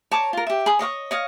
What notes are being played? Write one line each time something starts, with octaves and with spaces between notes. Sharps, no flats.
C#5 A5 A#5 D6
F4 A#4
G4 E5
G#4 B5 D#6
C#5 D#5 F5 C#6
C#5 D#5 F5